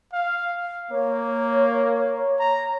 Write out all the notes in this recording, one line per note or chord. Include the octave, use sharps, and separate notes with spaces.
F5
A#3 C#5
A#5